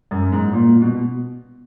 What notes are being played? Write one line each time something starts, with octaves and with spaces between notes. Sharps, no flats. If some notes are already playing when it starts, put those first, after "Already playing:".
F#2
G#2
A#2
B2